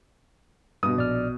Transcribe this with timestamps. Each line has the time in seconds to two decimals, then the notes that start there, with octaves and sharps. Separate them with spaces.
0.83 G2 B2 D#6
0.97 A#1 D5 F6